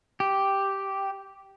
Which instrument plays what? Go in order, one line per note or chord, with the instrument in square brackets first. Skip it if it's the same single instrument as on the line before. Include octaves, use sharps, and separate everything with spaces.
[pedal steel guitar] G4